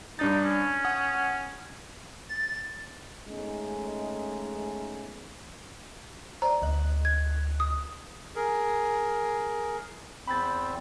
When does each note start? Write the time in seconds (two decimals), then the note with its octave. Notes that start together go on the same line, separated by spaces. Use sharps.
0.19 G2 D4 D#4 A6
0.44 C#4
0.84 F#5 D#6
2.29 A6
3.28 G#3 A3 B3 C#4 D#4 G#4
6.42 C5 D5 A#5
6.62 D2 D#5 F#6
7.05 G#6
7.60 D#6
8.36 G#4 A#4
10.27 E2 C4 B5 G6 A6